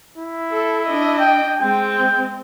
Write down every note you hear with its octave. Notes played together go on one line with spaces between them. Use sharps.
E4
A4
D4 D#5
G5
G#3 C4 G5